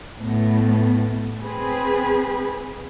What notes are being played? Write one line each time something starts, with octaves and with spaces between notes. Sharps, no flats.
A2 B3
C4 G#4 B4